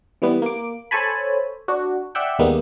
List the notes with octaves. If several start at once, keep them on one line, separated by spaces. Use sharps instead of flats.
E3 G3 B3
A#3 D6
A4 C5 C#5 G#5 A5 B5
D4 F#4
D5 E5 F#5 G5
D#2 D#3 G3 G#3 A#3 B3